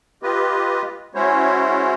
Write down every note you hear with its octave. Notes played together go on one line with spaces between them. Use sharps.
F4 G4 B4 D#5
G#3 C#4 E4 F#4 C5 C#5